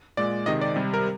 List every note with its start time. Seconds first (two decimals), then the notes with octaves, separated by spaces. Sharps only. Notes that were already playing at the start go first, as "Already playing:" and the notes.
0.17 A#2 G#3 D5
0.46 C3 D#3 G#3 D#5
0.61 D5
0.76 C3 G3
0.94 A#4